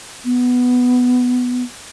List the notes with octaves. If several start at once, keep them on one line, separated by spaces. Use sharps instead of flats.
B3